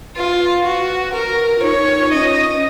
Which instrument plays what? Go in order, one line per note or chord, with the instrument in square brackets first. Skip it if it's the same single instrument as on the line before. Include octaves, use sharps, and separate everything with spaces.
[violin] F4 [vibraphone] B4
[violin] F#4
A#4
[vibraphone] F4
[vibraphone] D#4 [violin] C#5
[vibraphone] D#4
D#4
[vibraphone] C#4 [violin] D#5